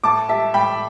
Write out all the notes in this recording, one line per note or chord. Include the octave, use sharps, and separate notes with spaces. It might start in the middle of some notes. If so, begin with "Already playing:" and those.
A2 A5 D6
G3 E5 A5
A2 G5 B5